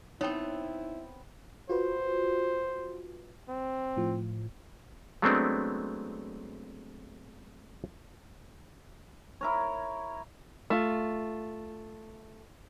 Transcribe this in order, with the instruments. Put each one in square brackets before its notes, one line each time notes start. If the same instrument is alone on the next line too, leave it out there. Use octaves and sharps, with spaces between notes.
[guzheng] B3 C4 [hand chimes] D#4 [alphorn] E4 [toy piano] C#5 G5
[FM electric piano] F4 F#4 B4 [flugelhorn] C5
[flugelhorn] C4
[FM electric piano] A2 F3
[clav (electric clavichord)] F#3 G#3 A3 B3 C4 D4
[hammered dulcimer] E4 A#4 C#5
[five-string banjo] A3 F4